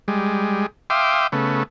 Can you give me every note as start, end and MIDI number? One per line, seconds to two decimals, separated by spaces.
0.08 0.66 55
0.08 0.66 56
0.90 1.27 76
0.90 1.27 77
0.90 1.27 79
0.90 1.27 84
0.90 1.27 86
0.90 1.27 87
1.32 1.63 49
1.32 1.63 57
1.32 1.63 59